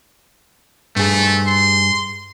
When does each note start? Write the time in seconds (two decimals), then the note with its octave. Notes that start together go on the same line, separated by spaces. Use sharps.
0.96 G2 A3 G#4
1.47 C6